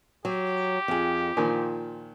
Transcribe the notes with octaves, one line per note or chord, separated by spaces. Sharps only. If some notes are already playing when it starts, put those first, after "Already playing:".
F#3 G4
F2 G#4
A#2 D#3 F3 G#5